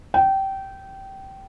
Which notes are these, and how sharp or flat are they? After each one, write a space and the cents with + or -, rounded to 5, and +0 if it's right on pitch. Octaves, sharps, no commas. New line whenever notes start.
G5 -20